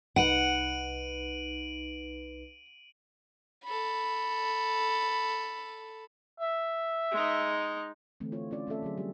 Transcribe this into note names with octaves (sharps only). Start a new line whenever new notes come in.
C2 D#4 B4 F#5 D7 D#7 F#7
A4 B5
E5
G#3 D#4
D3 E3 A3 C4
F4 C#5
C#4 F4 D5
A3 C4 C#4 F4 A4 E5
D3 F#3 G#4
G3 G4